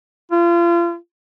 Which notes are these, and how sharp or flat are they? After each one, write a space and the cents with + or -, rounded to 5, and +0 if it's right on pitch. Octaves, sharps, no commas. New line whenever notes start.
F4 -35